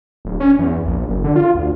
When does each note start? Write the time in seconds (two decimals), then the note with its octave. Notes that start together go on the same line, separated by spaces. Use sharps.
0.25 D1
0.40 C#4
0.59 E2
0.86 A#1
1.09 F#1
1.24 D3
1.36 F4
1.55 D2